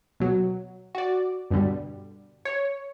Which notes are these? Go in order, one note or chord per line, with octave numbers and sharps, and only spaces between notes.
B2 F#3
F#4 D5
G2 B2 D3 G3
C#5